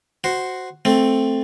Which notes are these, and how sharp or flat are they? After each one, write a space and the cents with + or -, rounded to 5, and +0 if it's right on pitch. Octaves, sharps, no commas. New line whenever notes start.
F#4 +0 C5 +0
A3 +0 C4 +0